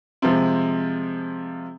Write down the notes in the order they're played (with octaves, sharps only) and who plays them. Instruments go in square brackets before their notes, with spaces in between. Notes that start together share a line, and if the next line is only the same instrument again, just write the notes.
[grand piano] C3 F3 G#3